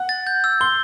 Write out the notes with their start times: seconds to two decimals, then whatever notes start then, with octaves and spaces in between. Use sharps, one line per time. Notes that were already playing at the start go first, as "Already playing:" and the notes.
Already playing: F#5
0.09 A6
0.27 G6
0.44 E6
0.61 C6 G7